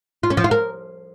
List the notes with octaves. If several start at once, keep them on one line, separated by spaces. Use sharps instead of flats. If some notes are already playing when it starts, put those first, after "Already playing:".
F4
C#4
F3
F4
A#4